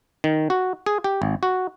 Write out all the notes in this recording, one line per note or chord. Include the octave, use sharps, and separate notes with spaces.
D#3
F#4
G#4
G4
G#1
F#4